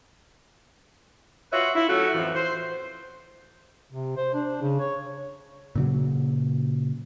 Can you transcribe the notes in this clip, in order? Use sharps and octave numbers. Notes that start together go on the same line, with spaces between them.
F4 F#4 B4 C#5 E5
E4
F#3 A3 C#4 F4 F#4
F2 A2 E3
C5
C3
C5
D4
C#3
C#5
A#2 C#3 F#3